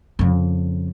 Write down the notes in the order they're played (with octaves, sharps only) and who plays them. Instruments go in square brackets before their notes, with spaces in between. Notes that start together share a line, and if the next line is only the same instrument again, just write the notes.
[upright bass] F2 C#3